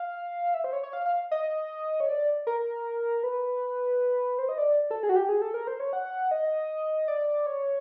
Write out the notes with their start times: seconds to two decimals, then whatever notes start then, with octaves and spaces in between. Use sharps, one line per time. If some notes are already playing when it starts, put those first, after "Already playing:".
Already playing: F5
0.54 E5
0.64 C5
0.73 C#5
0.83 C#5
0.93 F5
1.06 F5
1.31 D#5
2.00 C#5
2.09 D5
2.47 A#4
3.23 B4
4.38 C5
4.49 D#5
4.58 D5
4.91 A4
5.03 G#4
5.09 F#4
5.16 G4
5.29 G#4
5.42 A4
5.54 A#4
5.67 C5
5.80 C#5
5.93 F#5
6.31 D#5
7.08 D5
7.46 C#5